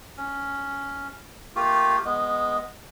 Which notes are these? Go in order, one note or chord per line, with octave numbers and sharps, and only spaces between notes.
C#4
A3 A#3 F4 G4
G#3 B3